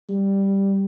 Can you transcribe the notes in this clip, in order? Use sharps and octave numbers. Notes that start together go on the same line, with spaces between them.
G3